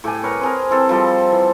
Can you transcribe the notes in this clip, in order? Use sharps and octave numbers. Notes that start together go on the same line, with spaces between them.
A2 G4 A4 G#5
A#4 B4 C#5
C4 G#4 A#4
E3 C4 A4
F3 G3 A4 D#5
E3